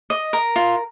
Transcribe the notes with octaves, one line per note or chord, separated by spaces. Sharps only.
D#5
A#4
F4